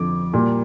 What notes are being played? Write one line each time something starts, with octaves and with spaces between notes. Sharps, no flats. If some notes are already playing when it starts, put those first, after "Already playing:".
Already playing: F2 D3 F3 D6
A#2 G3 A#3